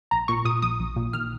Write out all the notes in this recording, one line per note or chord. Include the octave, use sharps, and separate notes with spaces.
A#1 A#5
A#2 C#6
A#2 D#6
A#1 D#6
A#1
A#2
D#3 F6